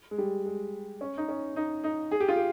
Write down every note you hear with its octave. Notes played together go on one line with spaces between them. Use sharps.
G#3
G3
G#3
C#4
D#4
C#4
D#4
D#4
G#4
G4
F4
G4